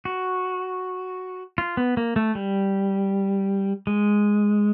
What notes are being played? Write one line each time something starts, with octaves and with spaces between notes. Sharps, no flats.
F#4
F4
B3
A#3
A3
G3
G#3